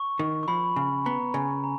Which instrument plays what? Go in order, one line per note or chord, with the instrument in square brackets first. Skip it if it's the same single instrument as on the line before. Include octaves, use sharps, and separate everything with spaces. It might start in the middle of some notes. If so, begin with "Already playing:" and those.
Already playing: [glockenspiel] C#6
[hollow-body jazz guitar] D#3
[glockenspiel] C#6
[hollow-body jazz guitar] F3 [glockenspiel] B5
[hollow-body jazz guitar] C#3
[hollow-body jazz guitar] B3 [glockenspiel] A#5
[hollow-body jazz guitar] C#3 [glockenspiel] G#5
[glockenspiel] A#5